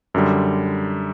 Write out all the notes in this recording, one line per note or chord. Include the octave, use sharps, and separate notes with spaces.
F#2 D3 G3